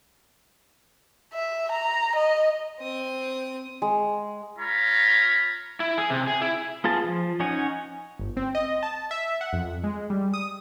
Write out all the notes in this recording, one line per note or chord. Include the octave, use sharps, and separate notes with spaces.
E5
A#5
D#5
C4 D#6
G#3
F4 C#5 A#5 B5
E4
G#4
C3
G#4
E4
B3 F4 G#4 A5
F3
C#4 D#4 C#5 F#5 G#5
G1
C4
D#5
A5
E5
F#5
F2
G#3
G3
D#6